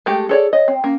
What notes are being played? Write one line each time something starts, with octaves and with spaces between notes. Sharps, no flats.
G#3 A3 G4
G#4 A4 C#5 D5
C#5 D#5
C4
A#3 C#4